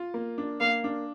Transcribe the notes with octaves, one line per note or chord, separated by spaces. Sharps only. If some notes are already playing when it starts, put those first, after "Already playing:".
Already playing: F4
A#3
D4
A#3 F5
D4